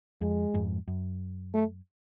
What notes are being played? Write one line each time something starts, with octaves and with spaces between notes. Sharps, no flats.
F2 G#3
F2 G#2
F#2
A3